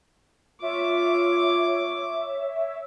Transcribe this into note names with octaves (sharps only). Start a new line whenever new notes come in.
F4 C#5 E5 D6